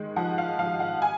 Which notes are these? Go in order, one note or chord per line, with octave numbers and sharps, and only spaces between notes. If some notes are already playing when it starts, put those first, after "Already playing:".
Already playing: D#3 G#3
F3 F#5
F5
F3 F5
F#5
G#5